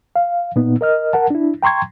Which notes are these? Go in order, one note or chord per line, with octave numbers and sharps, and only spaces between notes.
F5
A#2 B3 D#4
A#4 D#5 F6
A#4 F#5 A5
D4 E4
G5 A#5 C6 C#6 G#6